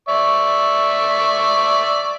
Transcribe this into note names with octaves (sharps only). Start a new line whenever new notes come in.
D5 E5 C#6